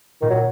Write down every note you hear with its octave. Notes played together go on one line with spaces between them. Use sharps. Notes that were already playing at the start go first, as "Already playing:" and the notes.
A#2 D#3
F#3